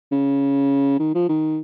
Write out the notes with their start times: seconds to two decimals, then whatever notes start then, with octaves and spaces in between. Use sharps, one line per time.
0.12 C#3
0.99 D#3
1.15 F3
1.29 D#3